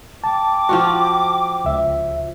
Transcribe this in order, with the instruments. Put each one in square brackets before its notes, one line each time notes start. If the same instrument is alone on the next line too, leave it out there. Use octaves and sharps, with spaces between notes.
[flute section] G5 D6 [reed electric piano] A5
[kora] F3 F4 F#4
[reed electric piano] C#2 E5